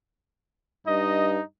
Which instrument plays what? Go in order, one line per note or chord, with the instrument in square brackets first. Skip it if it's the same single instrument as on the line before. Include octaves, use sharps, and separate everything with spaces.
[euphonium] G2 [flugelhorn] D#4 [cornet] D#5